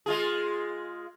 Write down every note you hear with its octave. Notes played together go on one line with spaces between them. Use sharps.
G#3 F4 G#4